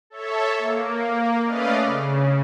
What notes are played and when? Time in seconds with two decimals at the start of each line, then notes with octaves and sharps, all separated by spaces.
0.10 A4 C#5 E5
0.58 A#3
1.43 A3 C#4 B4 D5 D#5 F5
1.80 C#3